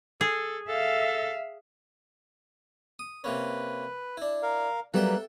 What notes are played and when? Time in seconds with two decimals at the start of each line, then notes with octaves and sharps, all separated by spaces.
0.21 G#4 A4
0.69 A4 E5 F5
2.99 D#6
3.24 C3 A#3 C#4 B4
4.17 D4 E4
4.43 A#4 F5
4.94 F#3 G3 A#3 B3 A4 E5 G5 F#6